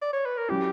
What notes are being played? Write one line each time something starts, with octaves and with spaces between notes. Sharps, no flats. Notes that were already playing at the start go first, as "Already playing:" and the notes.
D5
C#5
B4
A#4
F#3 C#4 E4 G4